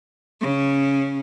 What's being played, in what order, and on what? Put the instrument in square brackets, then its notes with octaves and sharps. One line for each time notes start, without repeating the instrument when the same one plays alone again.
[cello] C#3 C#4